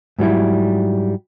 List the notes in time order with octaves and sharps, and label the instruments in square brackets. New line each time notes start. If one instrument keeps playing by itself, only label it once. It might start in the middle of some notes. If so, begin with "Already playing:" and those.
[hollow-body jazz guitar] G#2 F#3 G3 E4